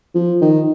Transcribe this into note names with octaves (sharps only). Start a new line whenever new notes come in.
F3
D#3